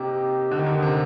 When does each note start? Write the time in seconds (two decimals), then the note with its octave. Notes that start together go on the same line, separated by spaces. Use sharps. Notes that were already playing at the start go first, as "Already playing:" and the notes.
Already playing: C3 A#3 D#4 G4
0.51 D3
0.59 D#3
0.66 D3
0.82 C3